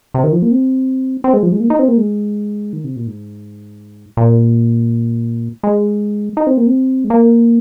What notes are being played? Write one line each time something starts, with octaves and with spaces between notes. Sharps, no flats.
C3
D#3
F3
A#3
C4
C4
G#3
F3
G#3
A#3
D#4
C4
A#3
G#3
D#3
C3
A#2
G#2
A#2
G#3
D#4
C4
A#3
C4
G#3
A#3